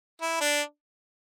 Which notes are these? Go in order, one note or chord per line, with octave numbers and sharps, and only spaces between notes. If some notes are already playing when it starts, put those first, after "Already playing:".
E4
D4